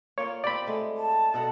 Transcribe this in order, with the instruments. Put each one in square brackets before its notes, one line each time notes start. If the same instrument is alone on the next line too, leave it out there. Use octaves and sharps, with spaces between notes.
[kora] A#3 F4 D5 [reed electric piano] C#5
[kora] C4 G4 [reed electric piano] D5 B5
[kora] G#3 A3
[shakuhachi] A5
[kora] B2 A4 F#5